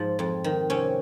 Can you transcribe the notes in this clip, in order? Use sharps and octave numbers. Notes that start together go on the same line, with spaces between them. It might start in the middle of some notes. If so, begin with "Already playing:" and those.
Already playing: G#2 F3
F2
D#3
C3 C#4